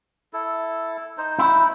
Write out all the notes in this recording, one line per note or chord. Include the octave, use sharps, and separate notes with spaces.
E4 A4
D#4 C5
E4